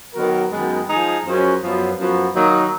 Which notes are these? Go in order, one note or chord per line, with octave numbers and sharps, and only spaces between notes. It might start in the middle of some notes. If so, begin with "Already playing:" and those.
D#3 F#3 B3 F#4 A#4
F#2 D#3 G#3 B3
F3 G#3 D#4 G#4
F#2 F3 G#3 C#4
F#2 F3 B3
F#2 F3 B3 F#4
D#3 F#3 A#3 D#4